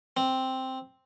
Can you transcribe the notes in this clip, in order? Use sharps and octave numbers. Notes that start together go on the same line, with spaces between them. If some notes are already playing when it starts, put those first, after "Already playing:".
C4